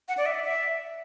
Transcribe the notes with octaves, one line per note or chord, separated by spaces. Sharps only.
F#5
D5
E5
D5
E5